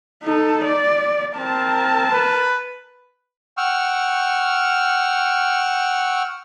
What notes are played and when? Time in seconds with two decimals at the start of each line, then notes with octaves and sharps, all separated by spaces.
0.24 D#4 A4
0.64 D5
1.37 C4 A#4 A5
2.11 B4
3.57 F#5 G5 C#6 E6 F6